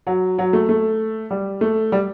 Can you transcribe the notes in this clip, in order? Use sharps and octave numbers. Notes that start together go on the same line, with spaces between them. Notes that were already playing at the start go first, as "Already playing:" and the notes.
F#3
F#3
A3
A3
G3
A3
G3